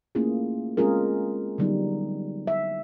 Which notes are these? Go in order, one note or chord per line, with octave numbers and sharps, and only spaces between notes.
A3 A#3 C#4 E4 F4 G#4
G#3 C4 C#4 F4 G#4 A#4
D3 F#3 G3 B3 D#4
E5